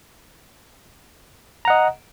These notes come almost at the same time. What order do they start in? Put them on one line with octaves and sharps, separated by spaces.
A#5 F#5 D#5